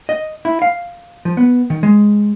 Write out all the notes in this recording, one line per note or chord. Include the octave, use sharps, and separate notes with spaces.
D#5
E4
F5
F3
B3
D#3
G#3